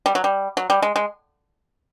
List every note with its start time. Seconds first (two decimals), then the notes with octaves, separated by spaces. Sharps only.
0.06 G3
0.15 F#3
0.24 G3
0.57 F#3
0.70 G3
0.82 G#3
0.96 G#3